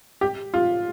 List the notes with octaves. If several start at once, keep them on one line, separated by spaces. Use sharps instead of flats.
G4
F4